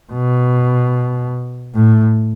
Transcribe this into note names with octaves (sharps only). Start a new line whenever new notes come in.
B2
A2